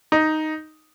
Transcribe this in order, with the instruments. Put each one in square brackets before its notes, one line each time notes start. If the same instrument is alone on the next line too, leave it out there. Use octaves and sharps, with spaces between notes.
[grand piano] D#4